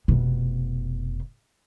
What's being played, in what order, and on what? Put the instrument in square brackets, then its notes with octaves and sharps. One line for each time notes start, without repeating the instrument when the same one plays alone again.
[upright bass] F1 B2